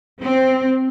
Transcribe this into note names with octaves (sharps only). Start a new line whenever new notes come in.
C4